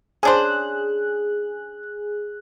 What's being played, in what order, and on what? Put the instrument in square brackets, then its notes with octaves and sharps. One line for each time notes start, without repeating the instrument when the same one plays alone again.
[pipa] C#4 D4 C5 [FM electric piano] G#4 F#6